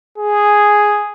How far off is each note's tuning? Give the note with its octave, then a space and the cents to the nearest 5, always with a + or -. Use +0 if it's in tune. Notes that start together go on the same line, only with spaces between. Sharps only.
G#4 +0